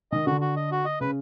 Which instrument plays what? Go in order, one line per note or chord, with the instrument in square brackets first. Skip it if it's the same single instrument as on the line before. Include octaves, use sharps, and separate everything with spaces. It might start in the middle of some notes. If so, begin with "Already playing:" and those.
[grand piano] D#3 [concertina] D#5
[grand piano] D3 [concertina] F#4
[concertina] F#4
D#5
F#4
D#5
[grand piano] C#3 [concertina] B4